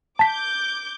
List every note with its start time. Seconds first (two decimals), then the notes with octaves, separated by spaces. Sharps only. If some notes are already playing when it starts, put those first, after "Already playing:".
0.19 A5 D6 G6 B6